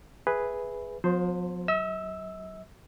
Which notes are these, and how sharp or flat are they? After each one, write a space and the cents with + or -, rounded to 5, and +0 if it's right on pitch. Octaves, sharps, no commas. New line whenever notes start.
G#4 +0 B4 +0 E5 +0
F3 +40 B3 +35 C5 +0
F#3 +25 E5 -45 E6 +5